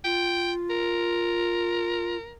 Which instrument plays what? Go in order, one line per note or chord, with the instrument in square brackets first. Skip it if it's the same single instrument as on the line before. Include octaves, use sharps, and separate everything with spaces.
[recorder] F4 [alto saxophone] G5
[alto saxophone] A#4